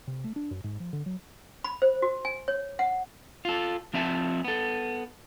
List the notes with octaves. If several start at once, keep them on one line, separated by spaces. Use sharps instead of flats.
C3
A3
D4
F#2
G#2
F3
D3
F#3
B5
C5
F#4
G#5
C#5
F#5
F4 A4
F3 C4 E4 E5 G#5 A5
B3 A4